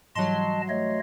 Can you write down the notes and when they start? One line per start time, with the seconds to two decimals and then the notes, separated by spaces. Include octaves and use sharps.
0.15 G#2 E3 F#3 G3 D#5 A5 C6
0.69 A3 C#5 D#5